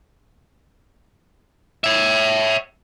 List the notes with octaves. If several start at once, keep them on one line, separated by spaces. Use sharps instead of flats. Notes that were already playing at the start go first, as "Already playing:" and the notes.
C#5 E5